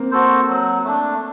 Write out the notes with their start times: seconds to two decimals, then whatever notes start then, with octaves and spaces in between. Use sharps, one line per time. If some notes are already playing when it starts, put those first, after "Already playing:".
Already playing: A#3 C4
0.11 F#4 A4 C5
0.49 F#3
0.84 A3 D4